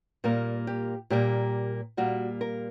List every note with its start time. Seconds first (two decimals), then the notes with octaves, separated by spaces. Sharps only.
0.24 A#2 G3 A#3 A#4
0.67 G4
1.10 A#2 G3 A#3 G4
1.97 A#2 G3 A#3 F#4
2.41 A#4